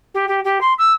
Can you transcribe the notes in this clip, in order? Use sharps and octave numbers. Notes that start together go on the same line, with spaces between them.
G4
G4
G4
C6
E6